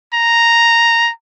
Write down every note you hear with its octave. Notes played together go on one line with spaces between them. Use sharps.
A#5